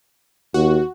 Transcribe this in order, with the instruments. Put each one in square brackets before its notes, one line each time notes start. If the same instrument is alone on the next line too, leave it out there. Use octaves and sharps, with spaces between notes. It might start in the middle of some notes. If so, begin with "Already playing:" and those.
[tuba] D#2 [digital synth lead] F#4